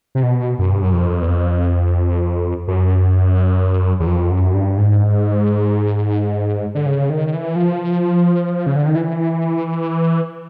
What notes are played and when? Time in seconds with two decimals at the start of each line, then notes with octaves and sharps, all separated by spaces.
0.15 C3
0.23 B2
0.59 F#2
0.71 G2
0.82 F#2
0.93 F2
1.22 E2
1.28 F2
2.68 F#2
4.00 E2
4.07 F2
4.30 F#2
4.54 G2
4.77 G#2
6.75 D3
6.86 C#3
7.10 D#3
7.33 E3
7.56 F3
8.67 C#3
8.76 D3
8.86 D#3
8.95 E3